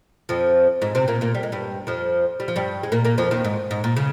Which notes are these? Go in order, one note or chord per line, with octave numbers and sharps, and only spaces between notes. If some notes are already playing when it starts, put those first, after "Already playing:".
F2 F3
G#2 G#3
C3 C4
A#2 A#3
A#2 A#3
G3
G#3
G2 G3
F2 F3
G3
F3
G2 G3
G#3
A#2 A#3
A#2 A#3
F2 F3
D#2 D#3
G#2
G#2
A#2
C#3